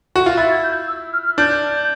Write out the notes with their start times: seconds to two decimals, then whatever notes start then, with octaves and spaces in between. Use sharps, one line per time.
0.16 F#4
0.26 F4
0.37 E4 A6
0.51 G#6
0.63 G6
0.87 E6
1.13 F6
1.25 F6
1.37 D4 G6